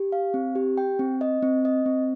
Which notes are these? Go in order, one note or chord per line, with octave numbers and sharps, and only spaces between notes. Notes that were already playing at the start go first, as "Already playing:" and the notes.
Already playing: G4
F5
C4
G4
G5
C4
D#5
C4
D#5
C4